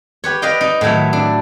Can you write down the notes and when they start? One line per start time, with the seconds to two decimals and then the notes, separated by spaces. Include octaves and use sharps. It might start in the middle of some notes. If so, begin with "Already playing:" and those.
0.24 G4 B4 C#5
0.42 B4 D5 D#5 F5 G5
0.61 D#4
0.81 A2 D#3 F#3 E4
1.13 D4